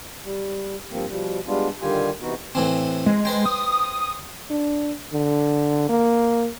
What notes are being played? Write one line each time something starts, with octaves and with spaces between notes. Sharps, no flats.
G3
G2 F3 A#3 C4
B2 F3 G3
G3 G#3 B3 D4 F4
D3 D#3 G3 F4 G4 G#5
C3 E3 B3 D#4 F#4
A2 E3 C4
G#3
G#3 B4 C5 G5
D#6
D4
D3
A#3